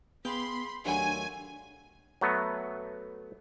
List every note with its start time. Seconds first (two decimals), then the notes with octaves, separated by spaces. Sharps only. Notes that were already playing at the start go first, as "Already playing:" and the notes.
0.25 B3 G#4 F5 G5 B5 C6
0.86 D#2 F#3 A3 D4 G#5
2.21 F#3 A3 B3